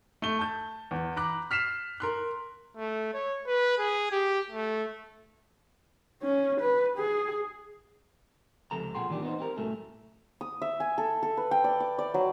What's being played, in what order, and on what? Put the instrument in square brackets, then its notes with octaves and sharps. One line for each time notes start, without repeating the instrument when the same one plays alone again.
[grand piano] A3 G7
A5 G6
E2
A#5 B5 D6 F#6
F6 B6 C7 E7
A#4 C6 F#6
[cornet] A3
C#5
B4
G#4
G4
A3
[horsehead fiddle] C#4
B4
G#4
[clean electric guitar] C#2 C3 F3 A4 A#5
B1 A#2 G#4 F#5 G5 C6
A#2 D#3 E3 G3 D4 G4
B3 D#4 C5
C4 G4 A#4
C2 A2 F#3 A3 C#4 A4
[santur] D#6
E5
G#5
A4
A4
B4
G5
D5
D6
D5
F#3